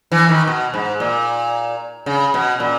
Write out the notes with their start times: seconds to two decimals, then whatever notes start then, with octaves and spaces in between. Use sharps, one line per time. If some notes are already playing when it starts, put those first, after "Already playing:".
0.12 E3
0.29 D#3
0.47 B2
0.74 G#2
1.00 A#2
2.06 C#3
2.34 B2
2.60 A#2